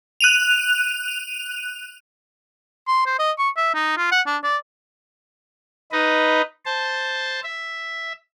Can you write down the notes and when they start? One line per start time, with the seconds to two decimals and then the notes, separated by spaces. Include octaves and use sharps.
0.20 F#6 D#7 F7
2.88 C6
3.06 C5
3.19 D#5
3.38 C#6
3.57 E5
3.74 D#4
3.97 F4
4.12 F#5
4.27 D4
4.44 D5
5.92 D#4 B4 D#5
6.65 C5 A5
7.43 E5